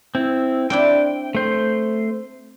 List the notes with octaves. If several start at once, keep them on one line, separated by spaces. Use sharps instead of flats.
C4 E4
C4 D4 E4 G5
A3 C5